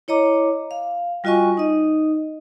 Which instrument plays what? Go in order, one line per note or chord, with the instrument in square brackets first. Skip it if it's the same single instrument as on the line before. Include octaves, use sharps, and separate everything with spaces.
[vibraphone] E4 C#5 D#5 A#5 D6
F5
G3 F4 F#4 D#5 G#5 C#6
D#4 D#5